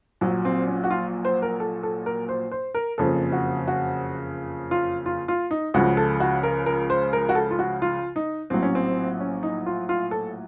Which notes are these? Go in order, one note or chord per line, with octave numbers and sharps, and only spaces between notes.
A#1 A#2 F#3
C4
C#4
F#4
F4
C5
A#4
A4
A4
A#4
C5
C5
A#4
F#1 F2 C#3 F3 A4
F#4
F#4
F4
F4
F4
D#4
C#2 C#3 F3 F#4
A4
F#4
A#4
A#4
C5
A#4
F#4
A4
F4
F#4
F4
D#4
A#1 A2 F#3 C4
C#4
C4
C#4
D#4
F4
F4
A4